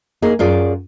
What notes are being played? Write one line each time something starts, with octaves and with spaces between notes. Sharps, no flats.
A#3 D#4 G#4
F#2 F4 G#4 D5